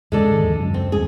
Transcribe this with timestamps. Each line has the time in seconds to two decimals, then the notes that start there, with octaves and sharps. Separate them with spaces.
0.12 E2 C#3 E3 G#3 A4 D5
0.29 G#2 D#3
0.44 D#2 F3 D4
0.59 F#2 C#3 F#3
0.74 C4
0.92 D#2 G3 C4 G#4